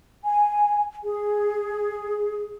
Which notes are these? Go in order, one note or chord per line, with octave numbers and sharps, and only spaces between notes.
G#5
G#4